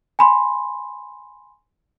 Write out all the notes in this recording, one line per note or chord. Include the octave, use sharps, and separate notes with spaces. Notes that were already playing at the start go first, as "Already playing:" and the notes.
G#5 B5 C6